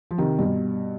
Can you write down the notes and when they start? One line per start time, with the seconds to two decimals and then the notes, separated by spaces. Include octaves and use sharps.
0.11 F3
0.18 C3 D#3
0.39 G2 B2